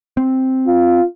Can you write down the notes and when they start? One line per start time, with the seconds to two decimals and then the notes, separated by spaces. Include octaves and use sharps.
0.17 C4
0.67 F4